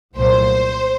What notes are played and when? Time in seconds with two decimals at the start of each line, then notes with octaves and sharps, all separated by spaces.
0.18 C2 A#2 F#3 A3 C5